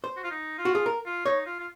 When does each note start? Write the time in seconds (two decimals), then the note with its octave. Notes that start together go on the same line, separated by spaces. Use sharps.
0.04 C5
0.17 F#4
0.24 F4
0.31 D#4
0.58 F4
0.65 F#4
0.75 G#4
0.86 A#4
1.06 F4
1.26 D#4 C#5
1.46 F4
1.60 F4